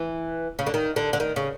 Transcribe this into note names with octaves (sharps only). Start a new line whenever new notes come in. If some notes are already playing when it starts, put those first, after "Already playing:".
Already playing: E3
C#3
D3
D#3
D3
D3
D#3
C#3